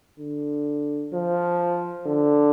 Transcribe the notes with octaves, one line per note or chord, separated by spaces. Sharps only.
D3
F3
D3